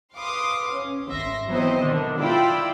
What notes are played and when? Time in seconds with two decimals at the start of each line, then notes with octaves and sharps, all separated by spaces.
0.15 B4 F5 C6 D6 D#6
0.73 C#4
1.10 G#1 E5 C6 A#6
1.49 E3 F#3 B3 C4 C5 D#5
1.81 B2 D3 D#3 D4
2.19 E4 F4 D5 G5 B5 E6